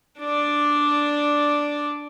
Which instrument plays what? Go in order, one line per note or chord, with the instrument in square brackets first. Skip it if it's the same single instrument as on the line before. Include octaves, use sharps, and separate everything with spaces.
[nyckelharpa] D4 D5